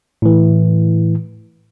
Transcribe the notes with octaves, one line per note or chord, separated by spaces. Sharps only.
A2 E3